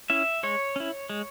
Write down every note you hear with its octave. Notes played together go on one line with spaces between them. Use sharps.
C#4 E4 E5
G#3 C#5
C#4 E4
G#3